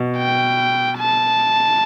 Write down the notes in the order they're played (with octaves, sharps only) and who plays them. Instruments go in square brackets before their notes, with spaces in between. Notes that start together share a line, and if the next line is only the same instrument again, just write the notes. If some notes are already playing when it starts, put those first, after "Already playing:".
Already playing: [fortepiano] B2
[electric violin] G5
A5